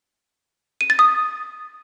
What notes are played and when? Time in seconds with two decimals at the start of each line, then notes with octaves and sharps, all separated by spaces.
0.81 D#7
0.90 A6
0.99 D#6